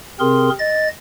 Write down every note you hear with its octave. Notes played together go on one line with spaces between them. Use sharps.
C3 C4 G#4 A#4 C6
D#5 A6